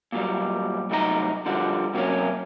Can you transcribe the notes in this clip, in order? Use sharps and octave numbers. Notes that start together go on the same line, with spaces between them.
A#2 F#3 G3
C2 A2 F#3 D#4 A4 A#5
D3 F3 G3 F#4
C3 F#3 A3 A#3 C#4